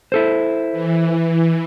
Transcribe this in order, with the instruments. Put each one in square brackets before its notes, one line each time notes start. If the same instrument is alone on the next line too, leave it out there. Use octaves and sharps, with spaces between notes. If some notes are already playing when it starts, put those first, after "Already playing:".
[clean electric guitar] E4 A4 C5
[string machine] E3